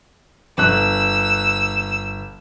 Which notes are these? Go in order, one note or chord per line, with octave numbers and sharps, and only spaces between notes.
G1 E6 F#6